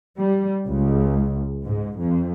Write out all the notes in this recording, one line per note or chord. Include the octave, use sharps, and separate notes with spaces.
G3
C#2
G#2
F2